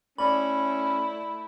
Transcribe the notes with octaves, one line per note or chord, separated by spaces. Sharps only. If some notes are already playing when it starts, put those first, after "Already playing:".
A3 C#4 E4 D5 B5